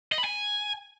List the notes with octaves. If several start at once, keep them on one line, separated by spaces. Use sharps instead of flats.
D#5
B5
G#5